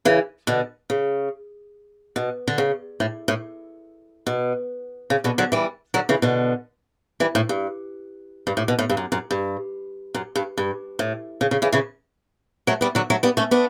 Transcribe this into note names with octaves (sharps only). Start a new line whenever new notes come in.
C#3 E3
B2 D3
C#3
B2
D3
C#3
A2
A2
B2
C#3
B2 D3
D3 F#3
E3 G3
D3 F#3
C#3 E3
B2 D3
E3 G3
A2
G2
G2
A2
B2
A2
G2
F#2
F#2
G2
F#2
G2
G2
A2
C#3
C#3
C#3 E3
C#3 E3
F#3 A3
G3 B3
D3 F#3
F#3 A3
G3 B3
A3 C#4
B3 D4